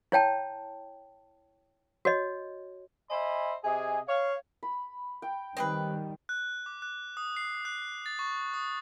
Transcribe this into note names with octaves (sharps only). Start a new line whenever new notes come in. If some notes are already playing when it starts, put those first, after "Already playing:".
E4 C#5 G5 A5
F#4 C#5 D#5
C5 D#5 E5 G#5 B5
C3 G#4 D#5 G#5
C#5 F5
B5
G5
D#3 G3 C4 G#4 B4
F#6
D6
F#6
D#6
C7
F#6
A6
C#6
D#6